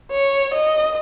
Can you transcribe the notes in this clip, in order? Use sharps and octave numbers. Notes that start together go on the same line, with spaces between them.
C#5
D#5